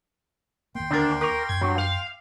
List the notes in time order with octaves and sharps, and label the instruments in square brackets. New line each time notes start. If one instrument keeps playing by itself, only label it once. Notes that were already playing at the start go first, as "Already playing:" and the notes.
[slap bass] D#2 A#3 [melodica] G5 C6
[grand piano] D2 A#4 [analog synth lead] D4
[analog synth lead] A#4 [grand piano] C#6 D6
[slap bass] F#2 [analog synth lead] G#6
[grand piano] G2 [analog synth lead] F#3
[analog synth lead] F5 [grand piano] F7